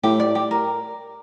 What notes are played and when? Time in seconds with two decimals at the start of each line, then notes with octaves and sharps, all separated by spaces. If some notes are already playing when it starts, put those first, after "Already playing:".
0.03 A2 G4
0.20 D5
0.35 G4
0.51 A#4